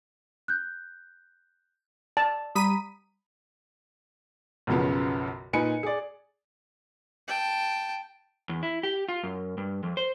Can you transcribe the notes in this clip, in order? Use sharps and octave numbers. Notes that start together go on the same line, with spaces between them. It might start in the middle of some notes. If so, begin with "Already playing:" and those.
F#6 G6
D5 A5
G3 A#5 B5 D#6 B6 D#7
B1 F#2 C#3 F3 B3
A#2 D#4 B4 G#5 C#7
G#4 D5
G5 A5
E2
E4
G4
F4
F#2
G2
F2
C5